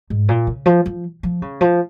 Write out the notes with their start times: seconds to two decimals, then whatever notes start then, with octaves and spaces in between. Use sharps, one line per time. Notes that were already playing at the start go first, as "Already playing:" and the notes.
0.10 G#2
0.29 A#2
0.47 C#3
0.66 F3
0.86 F3
1.23 F3
1.42 C#3
1.61 F3